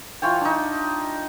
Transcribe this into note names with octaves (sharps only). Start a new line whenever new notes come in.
E3 F4 C#5 G5
D4 D#4